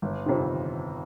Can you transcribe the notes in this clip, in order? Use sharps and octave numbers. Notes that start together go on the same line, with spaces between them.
G1
F2 C3 D#3